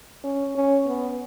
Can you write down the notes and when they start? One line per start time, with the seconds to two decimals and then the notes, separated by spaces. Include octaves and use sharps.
0.24 C#4
0.55 C#4
0.86 B3